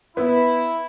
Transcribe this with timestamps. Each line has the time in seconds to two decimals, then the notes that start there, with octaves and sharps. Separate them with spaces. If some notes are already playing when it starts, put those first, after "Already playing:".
0.17 B3 E4